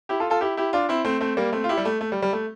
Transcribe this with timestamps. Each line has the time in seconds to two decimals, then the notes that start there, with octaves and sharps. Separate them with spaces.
0.09 E4 G4
0.20 F4 A4
0.30 F4 A4
0.41 E4 G4
0.57 E4 G4
0.73 D4 F4
0.89 C4 E4
1.05 A3 C4
1.21 A3 C4
1.37 G3 A#3
1.53 A3 C4
1.64 F4
1.69 E4 G4
1.77 G3
1.85 A3
2.01 A3
2.12 G3
2.22 G3
2.33 A3